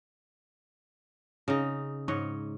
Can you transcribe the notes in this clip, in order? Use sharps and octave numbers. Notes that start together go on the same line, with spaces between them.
C#3 D#4
G#2 C#5 D#5